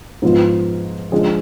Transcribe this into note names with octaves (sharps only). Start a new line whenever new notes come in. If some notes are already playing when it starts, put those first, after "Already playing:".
G#2 F3 B3 F4
F3 G#3 D4 G#4